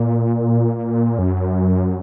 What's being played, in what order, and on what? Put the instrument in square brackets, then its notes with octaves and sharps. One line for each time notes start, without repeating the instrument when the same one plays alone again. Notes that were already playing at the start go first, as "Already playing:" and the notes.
Already playing: [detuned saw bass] A#2
F#2